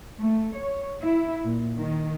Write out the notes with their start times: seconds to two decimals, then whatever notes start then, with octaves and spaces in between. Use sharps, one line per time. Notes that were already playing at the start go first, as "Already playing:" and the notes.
0.18 A3
0.54 C#5
1.01 E4
1.45 A#2
1.78 D#3